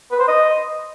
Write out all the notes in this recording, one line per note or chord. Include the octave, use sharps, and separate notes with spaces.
B4
C5
D#5